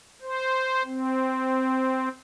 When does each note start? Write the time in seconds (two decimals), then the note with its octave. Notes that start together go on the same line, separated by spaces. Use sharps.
0.22 C5
0.85 C4